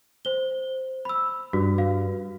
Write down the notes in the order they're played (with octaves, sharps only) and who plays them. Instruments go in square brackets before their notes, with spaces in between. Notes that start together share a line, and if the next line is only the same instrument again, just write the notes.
[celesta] C5 G7
B5 E6
[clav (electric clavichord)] G2 [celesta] F#4
[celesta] F#4 F5